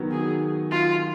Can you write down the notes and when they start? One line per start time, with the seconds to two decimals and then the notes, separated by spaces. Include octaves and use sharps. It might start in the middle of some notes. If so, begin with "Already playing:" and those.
Already playing: D#3 F#3 B3
0.11 G#4
0.71 F4